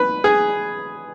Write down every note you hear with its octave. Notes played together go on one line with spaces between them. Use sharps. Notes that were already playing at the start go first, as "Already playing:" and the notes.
Already playing: B4
G#4